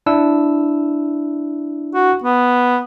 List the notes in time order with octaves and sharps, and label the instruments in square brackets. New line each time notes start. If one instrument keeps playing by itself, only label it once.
[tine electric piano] D4 E4 E6
[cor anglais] F#4
B3